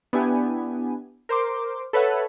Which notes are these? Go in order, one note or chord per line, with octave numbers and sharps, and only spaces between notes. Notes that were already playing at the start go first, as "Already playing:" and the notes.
B3 D4 E4 G4 G#5
A#4 C5 C6 D6
A4 B4 C#5 E5 F#5